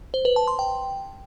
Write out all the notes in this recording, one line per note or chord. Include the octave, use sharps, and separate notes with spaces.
C5
B4
A5
C6
G5